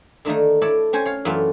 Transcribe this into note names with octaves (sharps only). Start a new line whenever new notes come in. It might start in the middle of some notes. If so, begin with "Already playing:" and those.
D3 D#3 A3 A#3 D#4
E4 A4 C#5 D5
C4 C#4 C5 G#5
C#5 F5
F#2 E3 A3 F4